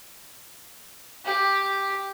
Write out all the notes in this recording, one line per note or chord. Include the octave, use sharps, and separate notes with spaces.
G4